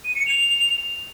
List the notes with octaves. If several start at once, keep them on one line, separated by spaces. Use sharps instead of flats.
D#7
C#7
F7